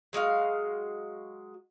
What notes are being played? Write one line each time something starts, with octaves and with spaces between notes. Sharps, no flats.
F#3 G#3 F#4 F5